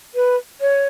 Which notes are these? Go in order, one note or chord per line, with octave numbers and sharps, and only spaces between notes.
B4
C#5